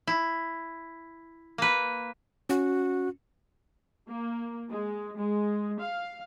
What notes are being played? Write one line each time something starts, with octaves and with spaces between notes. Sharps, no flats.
E4
A#3 B4
C#4 F#4
A#3
G#3
G#3
F5